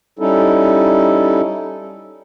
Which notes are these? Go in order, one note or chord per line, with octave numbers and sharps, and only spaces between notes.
G3 C#4 D#4 E4 A4